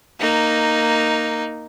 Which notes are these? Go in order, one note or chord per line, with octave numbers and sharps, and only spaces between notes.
A#3 D#4